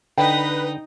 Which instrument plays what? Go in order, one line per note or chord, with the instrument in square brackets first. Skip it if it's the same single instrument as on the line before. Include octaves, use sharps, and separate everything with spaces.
[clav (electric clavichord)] D3 [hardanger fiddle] D#4 D#5 [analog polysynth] B4 [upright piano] G5